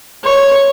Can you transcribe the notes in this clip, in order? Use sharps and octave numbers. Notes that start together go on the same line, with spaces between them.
C#5